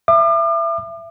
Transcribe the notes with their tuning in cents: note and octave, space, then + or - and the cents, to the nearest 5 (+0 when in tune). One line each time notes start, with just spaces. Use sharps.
E5 +20 D6 +40